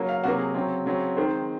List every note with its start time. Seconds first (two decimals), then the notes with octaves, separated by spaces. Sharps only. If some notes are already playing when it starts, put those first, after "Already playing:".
Already playing: C#3 F#3 A#3
0.09 F5
0.24 C3 F#3 A#3 F#4
0.39 G#4
0.54 C#3 F#3 C4
0.86 C#3 F#3 C4
1.16 D#3 G#3 C4 C5